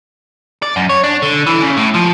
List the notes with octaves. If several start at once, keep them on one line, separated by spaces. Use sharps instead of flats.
D5
F#2
C#5
D4
D3
E3
C#3
A2
F3